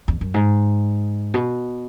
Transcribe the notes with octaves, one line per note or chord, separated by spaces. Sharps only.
E2
F#2
G#2
B2